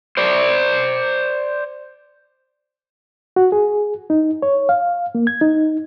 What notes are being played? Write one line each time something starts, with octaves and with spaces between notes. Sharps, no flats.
C5 D5
F#4
G#4
D#4
C#5
F5
A#3
G#6
D#4